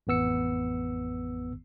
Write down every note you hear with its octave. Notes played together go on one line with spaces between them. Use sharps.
A1 F2 B3 E6 C#7